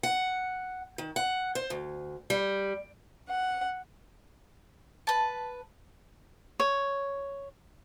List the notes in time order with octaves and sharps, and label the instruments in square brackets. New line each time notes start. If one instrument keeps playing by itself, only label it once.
[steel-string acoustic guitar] F#5
D#3
F#5
C5
D2
G3
[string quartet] F#5
[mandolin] B4 A5
[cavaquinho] C#5